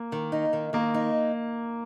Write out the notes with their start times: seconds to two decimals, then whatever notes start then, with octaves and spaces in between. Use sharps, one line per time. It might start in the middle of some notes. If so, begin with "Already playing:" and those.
Already playing: A#3
0.12 D#3
0.32 D#4
0.53 D#3
0.73 D#3 A#3
0.94 D#4